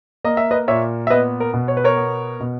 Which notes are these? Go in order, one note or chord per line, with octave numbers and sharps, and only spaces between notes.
A#3 D#5
E5
B4 D#5
A#2 C#5 E5
E5
B3 B4 D#5
A#4
B2
C#5
B4
A#4 C#5
B3
B2